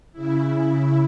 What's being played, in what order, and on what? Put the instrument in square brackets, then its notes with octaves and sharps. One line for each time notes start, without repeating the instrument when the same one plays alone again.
[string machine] C#3 E4